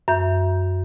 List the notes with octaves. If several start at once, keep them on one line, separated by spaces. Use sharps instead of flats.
F#2 E5 G6